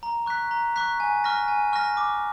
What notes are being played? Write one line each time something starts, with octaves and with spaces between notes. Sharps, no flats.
A#5
C#6 F#6 B6
A#5
C#6 F#6 B6
G#5
C#6 F6 A#6
G#5
C#6 F6 A#6
D6